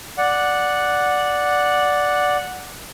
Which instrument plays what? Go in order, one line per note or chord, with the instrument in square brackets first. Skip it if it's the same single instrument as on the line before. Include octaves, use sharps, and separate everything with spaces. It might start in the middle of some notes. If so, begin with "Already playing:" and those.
[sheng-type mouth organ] D5 F#5